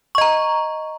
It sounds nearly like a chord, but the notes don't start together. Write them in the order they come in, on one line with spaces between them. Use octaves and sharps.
C#6 D#5 A#5